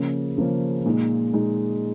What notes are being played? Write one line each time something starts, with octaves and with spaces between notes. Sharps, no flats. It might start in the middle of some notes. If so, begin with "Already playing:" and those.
Already playing: C#3 F3 A#3 C#4
C#3 F3 A#3 C#4
A#2 G#3 D#4
A#2 G#3 D#4